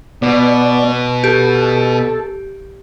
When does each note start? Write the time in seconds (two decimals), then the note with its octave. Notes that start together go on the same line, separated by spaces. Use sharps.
0.22 B2 B3 D5
1.24 G4 A4